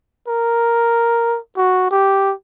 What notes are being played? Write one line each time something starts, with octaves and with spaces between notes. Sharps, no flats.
A#4
F#4
G4